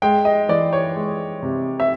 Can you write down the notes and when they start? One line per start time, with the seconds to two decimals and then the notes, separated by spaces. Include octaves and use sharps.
0.02 G#3 G5
0.25 D#5
0.49 E3 D5
0.73 C#5
0.95 G#3
1.42 C3
1.80 E5